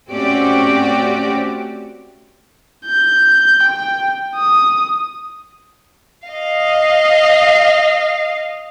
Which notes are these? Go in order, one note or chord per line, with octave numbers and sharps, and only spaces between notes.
A3 C4 C#4 F#4 G4 D5
G6
G5
D#6
D#5 F5